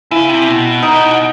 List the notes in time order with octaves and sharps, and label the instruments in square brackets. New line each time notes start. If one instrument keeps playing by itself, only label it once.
[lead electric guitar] C#3 [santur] E4
[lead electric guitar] C3
B2
[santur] D#4